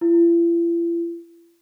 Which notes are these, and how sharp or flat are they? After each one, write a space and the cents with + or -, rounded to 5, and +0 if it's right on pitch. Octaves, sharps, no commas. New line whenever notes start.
E4 +45